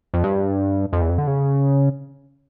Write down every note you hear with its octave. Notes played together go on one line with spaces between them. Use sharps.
F2
G2
F2
E2
F2
D3
C#3